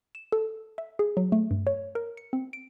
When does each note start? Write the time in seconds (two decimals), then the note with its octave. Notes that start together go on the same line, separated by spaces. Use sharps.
0.15 E7
0.32 A4
0.78 E5
0.99 G#4
1.17 F#3
1.32 A3
1.51 G2
1.67 C#5
1.95 A#4
2.17 C#7
2.33 C4
2.53 D7